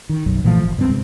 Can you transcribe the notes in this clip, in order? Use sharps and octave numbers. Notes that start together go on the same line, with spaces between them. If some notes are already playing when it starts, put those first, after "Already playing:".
D#3
B1 F#2
A#2 E3 F3 A3
G1
C#2 G2 G#3 C4
G2 C3 G#3